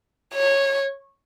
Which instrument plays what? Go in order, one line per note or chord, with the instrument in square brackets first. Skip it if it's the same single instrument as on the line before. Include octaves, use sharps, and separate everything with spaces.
[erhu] C#5